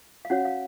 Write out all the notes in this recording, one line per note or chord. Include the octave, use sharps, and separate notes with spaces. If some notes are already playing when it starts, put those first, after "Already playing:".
F5
C#4 F#4 C#5 F#5
F5